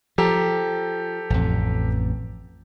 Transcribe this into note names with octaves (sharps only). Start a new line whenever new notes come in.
F3 G4 A4 A#5
A1 F2